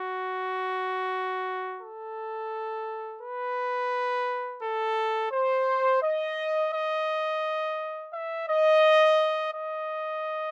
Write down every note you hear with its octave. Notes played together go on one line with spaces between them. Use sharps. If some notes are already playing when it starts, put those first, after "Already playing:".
Already playing: F#4
A4
B4
A4
C5
D#5
D#5
E5
D#5
D#5